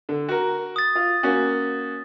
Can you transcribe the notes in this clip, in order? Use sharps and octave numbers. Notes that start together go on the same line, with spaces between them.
D3
F#4 A#4
D#6 A6
F4
A#3 C#4 F#4